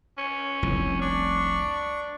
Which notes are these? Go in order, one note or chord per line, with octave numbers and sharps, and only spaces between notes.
C#4
F1 C2 A2
D4 C#6